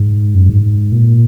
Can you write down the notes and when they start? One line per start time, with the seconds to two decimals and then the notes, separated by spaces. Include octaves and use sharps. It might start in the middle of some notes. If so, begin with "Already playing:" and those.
Already playing: G#2
0.35 F#2
0.49 G#2
0.92 A#2